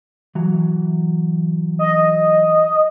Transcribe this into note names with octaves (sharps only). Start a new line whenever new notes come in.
E3 F#3
D#5